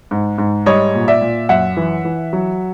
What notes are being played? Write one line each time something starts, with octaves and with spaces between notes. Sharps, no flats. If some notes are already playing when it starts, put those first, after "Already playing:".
G#2
G#2
G3 C#5 D#5
A#2
D5 E5
A#2
F#2 E5 F#5
E3
E3
F#3